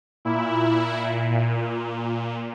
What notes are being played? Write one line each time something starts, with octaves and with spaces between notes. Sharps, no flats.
A#2 E4
A#2